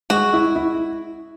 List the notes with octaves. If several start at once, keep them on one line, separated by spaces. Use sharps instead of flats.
G#3 F#4
E4
E4